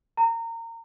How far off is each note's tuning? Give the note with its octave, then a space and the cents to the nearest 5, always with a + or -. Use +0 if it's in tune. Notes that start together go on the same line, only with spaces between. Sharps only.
A#5 -25